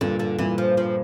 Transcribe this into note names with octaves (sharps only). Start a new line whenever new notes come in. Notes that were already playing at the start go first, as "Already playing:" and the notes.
G2 A#2 D3
D3
G2 A#2 E3
F3
F3